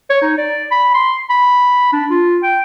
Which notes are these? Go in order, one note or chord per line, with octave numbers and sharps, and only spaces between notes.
C#5
D#4
D5
B5
C6
B5
D4
F4
G5